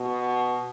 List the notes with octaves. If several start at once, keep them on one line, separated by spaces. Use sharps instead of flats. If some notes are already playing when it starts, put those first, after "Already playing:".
Already playing: B2